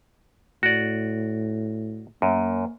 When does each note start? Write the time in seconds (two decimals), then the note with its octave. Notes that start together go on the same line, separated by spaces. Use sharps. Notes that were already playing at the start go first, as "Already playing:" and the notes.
0.63 A2 F#4 D5
2.22 F#2 A#3